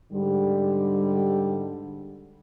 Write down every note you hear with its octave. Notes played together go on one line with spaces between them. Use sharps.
G#2 D3 G3